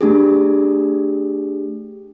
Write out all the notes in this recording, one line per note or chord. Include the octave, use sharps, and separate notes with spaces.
A3 D4 G4 G#4